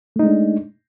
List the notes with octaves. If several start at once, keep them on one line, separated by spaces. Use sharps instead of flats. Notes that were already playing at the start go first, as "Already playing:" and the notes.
G#3 A3 D4 D#4